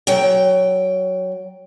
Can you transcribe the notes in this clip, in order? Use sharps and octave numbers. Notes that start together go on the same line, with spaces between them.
F#3 G5